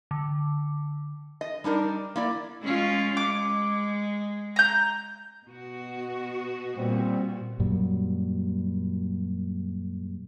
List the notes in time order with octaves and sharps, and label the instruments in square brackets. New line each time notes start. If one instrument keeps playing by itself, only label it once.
[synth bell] D3
[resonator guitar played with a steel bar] D#5
G3 D4 D#4 A#4
A#3 E4 D5
[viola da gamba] G#3 C#4 F4
[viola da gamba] G#3 [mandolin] D6
[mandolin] A#5 G6
[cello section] B2 B3 F#4
[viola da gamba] A#2 [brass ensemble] G3 C4
[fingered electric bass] F#2 A#2 F#3 G3